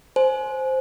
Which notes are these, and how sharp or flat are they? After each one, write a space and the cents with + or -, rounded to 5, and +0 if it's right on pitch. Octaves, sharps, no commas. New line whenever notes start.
C5 +0 G#5 +30